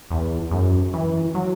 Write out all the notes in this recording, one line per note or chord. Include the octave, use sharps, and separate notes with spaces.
E2
F#2
E3
F#3